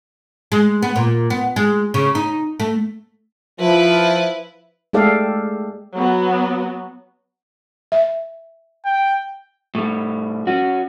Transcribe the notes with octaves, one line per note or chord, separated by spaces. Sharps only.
G#3
B3
A#2
B3
G#3
C#3
D#4
A3
F3 E4 B4
G#3 A3 G4 A4 D5 F5
F#3 B3 F#4
E5
G5
A2 G3
C#4 F#4